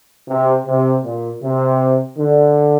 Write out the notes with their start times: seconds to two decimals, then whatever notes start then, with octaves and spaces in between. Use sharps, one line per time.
0.28 C3
0.67 C3
1.04 A#2
1.43 C3
2.19 D3